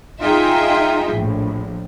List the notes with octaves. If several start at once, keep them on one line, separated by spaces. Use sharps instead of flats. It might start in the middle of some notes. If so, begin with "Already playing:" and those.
D#4 F4 G#4 E5 G5
A#1 A2